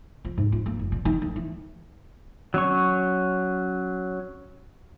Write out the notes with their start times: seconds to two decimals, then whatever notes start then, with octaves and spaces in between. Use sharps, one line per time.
0.25 F3
0.38 G#2
0.52 F4
0.66 A#3
0.79 F#1
0.92 A#2
1.05 D#3
1.22 D2
1.36 E3
2.54 F#3 C#4 C#6